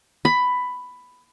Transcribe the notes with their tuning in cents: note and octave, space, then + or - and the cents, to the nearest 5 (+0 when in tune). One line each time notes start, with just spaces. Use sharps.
B5 +10